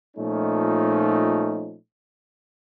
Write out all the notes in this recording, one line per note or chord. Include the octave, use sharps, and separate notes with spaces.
A#2 F3 A3 C#4 D#4